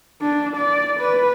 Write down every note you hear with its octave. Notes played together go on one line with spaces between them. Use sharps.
D4
D5
B4